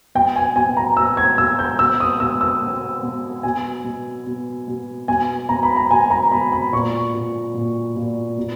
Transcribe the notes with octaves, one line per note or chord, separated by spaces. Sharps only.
B2 G5
G#5
B2 G#5
A#5
B2 E6
G#6
B2 E6
G6
B2 E6
D#6
B2 E6
E6
B2
B2
B2 G#5
B2
B2
B2
B2 G#5
B2 A#5
B5
A#5
B2 G#5
A#5
B2 B5
B5
A#2 C#6
A#2
A#2
A#2
B2